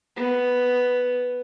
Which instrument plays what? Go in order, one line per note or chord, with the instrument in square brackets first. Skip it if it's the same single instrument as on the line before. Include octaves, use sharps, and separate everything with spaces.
[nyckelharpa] B3